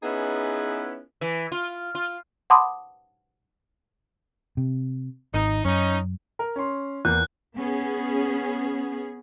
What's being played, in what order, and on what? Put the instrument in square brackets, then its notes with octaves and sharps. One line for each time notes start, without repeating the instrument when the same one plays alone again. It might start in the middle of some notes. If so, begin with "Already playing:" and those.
[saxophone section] B3 C#4 D#4 E4 G#4 B4
[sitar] E3
F4
F4
[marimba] F#5 A5 B5 C6 D6 D#6
[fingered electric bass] C3
[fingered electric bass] G#1 [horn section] D#4
[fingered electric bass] F#2 [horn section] C#4 D#4
[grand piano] A#4
C#4 C6
[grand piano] E2 A#3 G6 [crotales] F#6
[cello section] B3 C#4 G#4